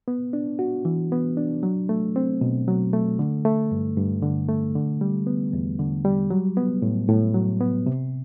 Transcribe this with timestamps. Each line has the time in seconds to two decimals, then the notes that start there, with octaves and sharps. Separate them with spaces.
0.08 B3
0.33 D4
0.59 F#4
0.85 E3
1.12 B3
1.37 D4
1.63 F#3
1.89 A3
2.16 C4
2.41 B2
2.68 F#3
2.93 A3
3.19 D3
3.45 A3
3.72 G2
3.97 G2
4.22 D3
4.49 A3
4.75 D3
5.01 G3
5.27 B3
5.53 E2
5.79 D3
6.05 G3
6.30 F#3
6.57 B3
6.82 A2
7.09 A2
7.34 F#3
7.60 B3
7.86 C3